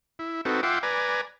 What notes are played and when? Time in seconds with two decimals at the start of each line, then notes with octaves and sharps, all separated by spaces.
0.19 E4
0.45 C4 D#4 F#4 A4 B4
0.63 F4 E5 F#5 G5 C6 D6
0.83 B4 D5 G#5 A#5